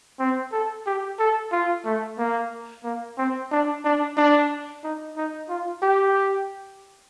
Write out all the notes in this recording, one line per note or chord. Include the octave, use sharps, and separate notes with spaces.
C4
A4
G4
A4
F4
A3
A#3
A#3
C4
D4
D4
D4
D#4
D#4
F4
G4